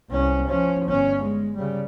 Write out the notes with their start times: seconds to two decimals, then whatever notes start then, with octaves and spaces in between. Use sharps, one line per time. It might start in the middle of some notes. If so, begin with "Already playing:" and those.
0.10 C2 C#4
0.47 F3 C#4
0.86 G1 C#4
1.22 G#3
1.56 C#3 G3